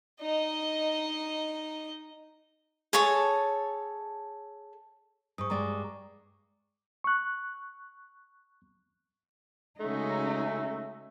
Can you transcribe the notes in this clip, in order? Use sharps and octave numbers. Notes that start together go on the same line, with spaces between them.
D#4 D#5
G#4 A4 C#5 A5
G#2 C#6 D#6
G2 G#3 D5 A#5 D6
C#6 F#6
C#3 G#3 A3 C#4 D#4 F#4 E5